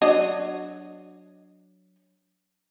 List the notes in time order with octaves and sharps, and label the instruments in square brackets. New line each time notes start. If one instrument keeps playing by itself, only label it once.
[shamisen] F#3 D4 D#5